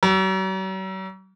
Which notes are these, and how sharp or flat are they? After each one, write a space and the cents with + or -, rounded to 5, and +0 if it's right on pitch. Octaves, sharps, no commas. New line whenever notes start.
F#3 +45